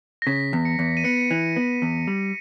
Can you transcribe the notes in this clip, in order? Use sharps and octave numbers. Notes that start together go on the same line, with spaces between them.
A#6
C#3 B6
E2
C#7
E2
D#7
B3 C#7
E3
B3
E2
G3